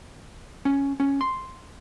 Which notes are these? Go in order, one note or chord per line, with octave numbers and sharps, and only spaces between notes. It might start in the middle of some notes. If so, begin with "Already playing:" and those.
C#4
C#4
C6